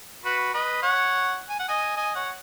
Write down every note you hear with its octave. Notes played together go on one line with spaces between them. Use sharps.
F#4 B4
B4 D#5
C#5 F#5
G#5
F#5
D#5 G#5
D#5 G#5
C#5 F#5